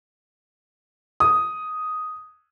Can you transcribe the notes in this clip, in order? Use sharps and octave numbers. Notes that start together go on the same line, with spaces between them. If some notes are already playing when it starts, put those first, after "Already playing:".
D#6